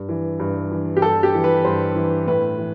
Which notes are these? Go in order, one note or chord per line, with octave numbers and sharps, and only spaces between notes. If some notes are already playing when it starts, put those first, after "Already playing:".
Already playing: G2
E3
G2
E3
G4
G2 A4
G4
E3
B4
G2 C5
E3
A2 B4
E3